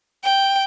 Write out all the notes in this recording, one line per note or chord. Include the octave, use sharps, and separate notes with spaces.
G5